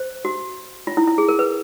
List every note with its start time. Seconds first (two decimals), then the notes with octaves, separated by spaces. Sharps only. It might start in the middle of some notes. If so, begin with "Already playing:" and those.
Already playing: C5
0.25 F#4
0.87 F4
0.97 E4
1.08 E4
1.18 G#4
1.29 A#4
1.39 B4